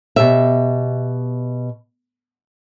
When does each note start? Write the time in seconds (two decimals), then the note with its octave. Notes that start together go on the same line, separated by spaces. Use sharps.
0.16 B2 G4 E5